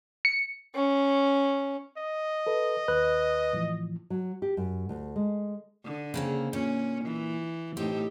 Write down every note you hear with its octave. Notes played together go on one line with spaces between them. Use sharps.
C#7
C#4
D#5
A4 B4
D#2 B4 F#6
A2 E3 F3
F#3
G4
F#2
D2
G#3
D3
C#3 A#3 C4
A#2 C#4
E3
A2 C4 D#4 G4